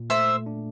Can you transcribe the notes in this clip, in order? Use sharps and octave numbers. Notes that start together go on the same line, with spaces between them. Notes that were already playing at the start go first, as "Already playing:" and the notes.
Already playing: A#2
A3 C5 E5
D4